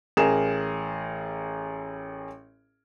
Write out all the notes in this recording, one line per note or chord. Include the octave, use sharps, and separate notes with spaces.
A1 G#4 A#4 E7